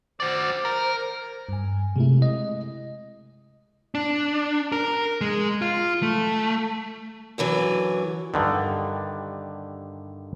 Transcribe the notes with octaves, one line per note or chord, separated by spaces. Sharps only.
F#4 C5 D5
A#4
G2 G#5
C3 G#3 A3 E4
D#5
D4
A#4
G#3
F4
A3
F#2 D3 E3 F#3
G2 D3 D#3